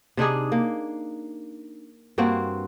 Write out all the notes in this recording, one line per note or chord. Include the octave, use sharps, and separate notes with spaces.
C3 D4 D#4 G#4
A#3
G2 A#3 C4 F#4